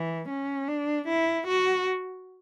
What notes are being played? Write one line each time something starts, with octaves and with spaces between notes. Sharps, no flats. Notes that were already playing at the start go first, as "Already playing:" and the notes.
Already playing: E3
C#4
D4
E4
F#4